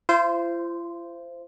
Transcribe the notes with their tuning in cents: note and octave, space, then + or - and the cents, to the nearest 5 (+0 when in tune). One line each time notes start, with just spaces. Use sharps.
F4 -45 C5 -10